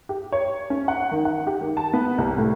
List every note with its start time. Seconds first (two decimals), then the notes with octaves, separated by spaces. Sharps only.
0.09 G4
0.32 C#5
0.70 C#4
0.88 F#5
1.11 D#3
1.25 F#5
1.47 G4
1.61 D#3
1.77 A5
1.94 B3
2.18 C2
2.38 A2